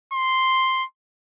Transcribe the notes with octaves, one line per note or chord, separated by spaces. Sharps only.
C6